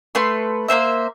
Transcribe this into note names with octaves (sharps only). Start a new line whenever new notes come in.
A3 B4 C6
A#3 B3 C5 E5